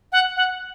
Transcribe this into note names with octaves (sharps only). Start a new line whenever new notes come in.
F#5
F#5